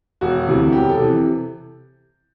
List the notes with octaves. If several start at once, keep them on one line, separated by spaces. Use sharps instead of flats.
E1 F#4
D2 C3 E3
E1 G4
A4
C3 E3